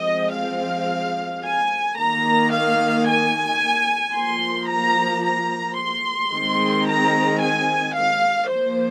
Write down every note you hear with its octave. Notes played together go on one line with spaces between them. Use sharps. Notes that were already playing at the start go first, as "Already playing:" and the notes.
Already playing: F3 G#3 C4 D#5
F5
G#5
D#3 A#3 A#5
F5
G#5
F3 A#3 C6
A#5
A#5
C6
D#3 G#3 C4
A#5
G#5
F5
F3 A#3 C5